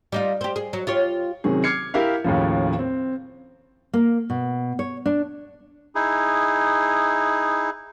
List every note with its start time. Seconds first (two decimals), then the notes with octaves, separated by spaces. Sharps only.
0.12 G3 D#4 F4
0.41 C4 G4
0.56 G#4
0.73 F#3
0.87 F4 G4 C#5
1.44 C3 D#3 F#3 C#4 G#4
1.64 D6 F6 G#6 C7 C#7
1.94 E4 G4 A#4 E5 F5
2.24 D#2 A2 C#3 F3
2.79 C4
3.93 A#3
4.30 B2
4.79 C#5
5.06 D4
5.95 D#4 E4 G#4